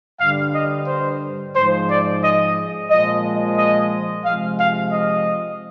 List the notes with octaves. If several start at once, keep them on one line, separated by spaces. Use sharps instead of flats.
G2 D3 G3 F5
D#5
C5
G#2 F3 G#3 C5
D5
D#5
A#2 F3 G#3 D#5
D#5
C3 F3 G#3 F5
F5
D#5